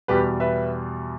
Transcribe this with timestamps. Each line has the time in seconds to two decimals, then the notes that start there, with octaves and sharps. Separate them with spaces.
0.08 E2 B2 G3 G4 B4
0.40 B4 E5